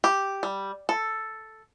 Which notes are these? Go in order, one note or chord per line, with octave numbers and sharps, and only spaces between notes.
G4
G3
A4